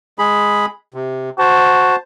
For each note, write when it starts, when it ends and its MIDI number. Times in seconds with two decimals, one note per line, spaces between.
0.19 0.66 56
0.19 0.66 68
0.19 0.66 83
0.94 1.30 48
1.39 1.95 66
1.39 1.96 72
1.39 1.96 81